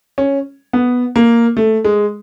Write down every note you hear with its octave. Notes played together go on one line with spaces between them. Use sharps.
C#4
B3
A#3
A3
G#3